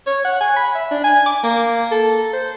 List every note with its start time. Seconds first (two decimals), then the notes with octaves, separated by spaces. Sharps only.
0.07 C#5
0.25 F#5
0.40 G#5
0.56 B5
0.75 E5
0.91 D4
1.04 G#5
1.26 D6
1.43 A#3
1.92 A4
2.33 C5